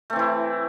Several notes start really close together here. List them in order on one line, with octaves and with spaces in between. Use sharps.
A3 C4 E3 E4